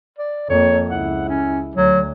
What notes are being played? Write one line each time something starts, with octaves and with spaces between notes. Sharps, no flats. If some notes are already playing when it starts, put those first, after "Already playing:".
D5
F2 A#3 C#5
C#2 E4 F#5
C#4
D2 F#3